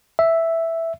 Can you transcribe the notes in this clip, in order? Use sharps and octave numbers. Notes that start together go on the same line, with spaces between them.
E5